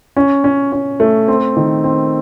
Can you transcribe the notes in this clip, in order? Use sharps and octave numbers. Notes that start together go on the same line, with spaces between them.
C#4
C#4
C#4
A3
C4
D#3
C4